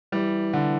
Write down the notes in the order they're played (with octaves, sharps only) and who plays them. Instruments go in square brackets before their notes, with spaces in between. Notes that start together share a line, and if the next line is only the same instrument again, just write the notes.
[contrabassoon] E3 [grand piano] G3
[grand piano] D3